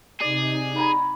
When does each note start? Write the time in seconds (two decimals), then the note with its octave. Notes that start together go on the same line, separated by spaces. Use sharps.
0.21 C3 D#4 G#4 D5
0.76 G#5 A#5 B5